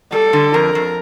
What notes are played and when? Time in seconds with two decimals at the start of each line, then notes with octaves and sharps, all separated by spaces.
0.12 G3 A4
0.33 D3
0.54 F2 A#4
0.75 F2